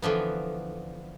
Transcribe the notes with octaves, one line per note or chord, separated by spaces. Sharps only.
D3 E3 F3 B3